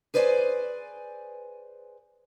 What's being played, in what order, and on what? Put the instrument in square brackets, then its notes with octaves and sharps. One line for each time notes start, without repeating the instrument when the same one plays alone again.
[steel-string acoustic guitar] G#4 B4 C5 D5 G#5